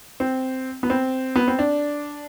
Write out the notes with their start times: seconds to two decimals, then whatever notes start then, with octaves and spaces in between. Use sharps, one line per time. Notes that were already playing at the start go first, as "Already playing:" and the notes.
0.20 C4
0.83 B3
0.90 C4
1.36 B3
1.48 C4
1.59 D4